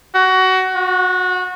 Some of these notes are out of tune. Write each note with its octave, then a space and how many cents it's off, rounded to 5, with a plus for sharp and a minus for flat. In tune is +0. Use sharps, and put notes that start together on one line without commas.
F#4 +20
F#4 -25